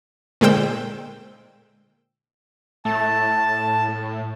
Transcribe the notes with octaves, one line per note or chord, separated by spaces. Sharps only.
A#2 D3 G#3 C5 G5 E6
A2 A3 A5